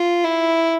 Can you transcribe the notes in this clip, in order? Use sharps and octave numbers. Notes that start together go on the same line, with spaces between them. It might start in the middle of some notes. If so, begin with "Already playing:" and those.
Already playing: F4
E4